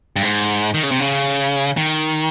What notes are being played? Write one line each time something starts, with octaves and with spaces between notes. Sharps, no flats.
G2
G#2
D#3
C#3
C3
C#3
D#3